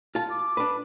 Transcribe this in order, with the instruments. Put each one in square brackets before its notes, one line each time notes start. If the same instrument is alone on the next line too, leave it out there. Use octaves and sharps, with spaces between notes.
[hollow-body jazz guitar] F4 A5
[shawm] D6
[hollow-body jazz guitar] D4 B4